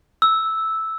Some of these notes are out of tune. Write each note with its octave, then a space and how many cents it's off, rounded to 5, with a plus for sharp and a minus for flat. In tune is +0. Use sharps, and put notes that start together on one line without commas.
E6 -5